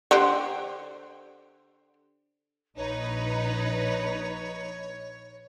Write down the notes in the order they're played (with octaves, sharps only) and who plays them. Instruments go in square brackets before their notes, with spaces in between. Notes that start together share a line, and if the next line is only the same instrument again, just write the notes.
[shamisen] D3 G4 C5
[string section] A#1 D#4 B4 [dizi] C#5